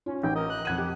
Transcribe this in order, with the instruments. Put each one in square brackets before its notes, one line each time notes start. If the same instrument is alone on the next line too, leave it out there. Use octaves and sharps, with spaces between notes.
[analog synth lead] C#4 [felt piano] F4
[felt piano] A1 [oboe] G5
[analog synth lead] A#4 [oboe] D#5
[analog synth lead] F#6
[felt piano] F2 G#6 D#7 [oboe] F#5
[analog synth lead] G4